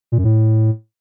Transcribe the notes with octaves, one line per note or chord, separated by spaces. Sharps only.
A#2
F#2
A2